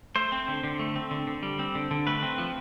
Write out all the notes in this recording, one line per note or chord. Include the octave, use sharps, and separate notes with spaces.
A3 C5
C4
D3
D3
A3
C4
D3
D3
G3
C4
D3
D3
A3 B4
C4
F3